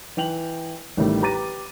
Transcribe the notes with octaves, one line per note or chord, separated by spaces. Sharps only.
E3 G5 F7 F#7
A1 A2 D#3 G3 A3
G4 B4 A#5 D6 A6 D#7